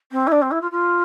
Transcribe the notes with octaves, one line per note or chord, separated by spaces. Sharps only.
C4
E4
D4
C4
E4
F4
F4